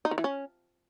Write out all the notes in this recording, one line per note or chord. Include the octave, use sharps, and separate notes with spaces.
D#4
D#3
E3
C#4